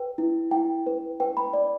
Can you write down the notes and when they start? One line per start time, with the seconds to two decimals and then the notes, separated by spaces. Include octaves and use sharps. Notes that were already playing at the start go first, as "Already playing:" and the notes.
Already playing: B4 G5
0.18 E4
0.51 E4 G5
0.86 B4
1.20 B4 G5
1.37 B5
1.54 D5